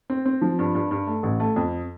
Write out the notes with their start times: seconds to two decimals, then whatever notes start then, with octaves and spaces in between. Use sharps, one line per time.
0.10 C4
0.26 C4
0.42 F3
0.59 G2
0.75 G2
0.91 G2
1.07 A3
1.23 A1
1.40 A3
1.56 F2